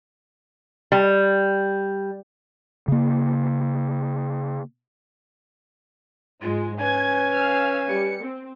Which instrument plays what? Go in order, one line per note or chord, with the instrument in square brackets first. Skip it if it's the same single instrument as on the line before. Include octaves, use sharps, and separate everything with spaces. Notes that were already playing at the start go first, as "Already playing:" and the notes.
[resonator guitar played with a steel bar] G3
[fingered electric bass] C#3 A#3
[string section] G#2 G#3 [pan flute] F4
[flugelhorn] C#4 [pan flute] B4 [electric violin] G#5 [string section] G#6
[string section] F5 E6 F6
G3 C#7
C4